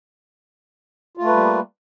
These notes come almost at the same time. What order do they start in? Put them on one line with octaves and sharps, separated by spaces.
F4 A3 B4 G3 A#3